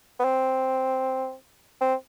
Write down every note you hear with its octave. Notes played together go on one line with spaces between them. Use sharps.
B3
C4
C4